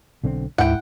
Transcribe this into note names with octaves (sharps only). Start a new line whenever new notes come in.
B1 D3 C4
D2 G#2 E4 F#5 G5